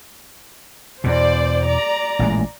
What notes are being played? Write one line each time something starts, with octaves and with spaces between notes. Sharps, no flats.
E2 B2 C5 D5
D5 A#5
A1 A#2 G#3